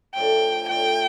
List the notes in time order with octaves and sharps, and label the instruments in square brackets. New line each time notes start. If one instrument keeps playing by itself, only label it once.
[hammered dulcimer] A2 F3 A3 D4 [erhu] G5
[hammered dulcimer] A2 F3 A3 D4 [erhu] G5